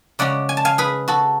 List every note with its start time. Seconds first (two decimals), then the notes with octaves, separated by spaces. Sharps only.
0.19 C#3 G#3 C#4 D5 F#5
0.49 G#5
0.57 A5
0.65 F5 G#5
0.78 G#4 B4
1.08 F#4 A4